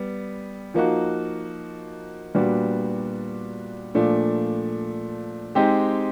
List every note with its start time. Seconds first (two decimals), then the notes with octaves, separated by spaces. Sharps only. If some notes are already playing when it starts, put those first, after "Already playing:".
Already playing: G3 B3
0.74 F3 A#3 D#4 F#4
2.35 A#2 G3 B3 D4 F#4
3.95 A#2 F3 A3 D4
5.55 G#3 C4 D#4 G4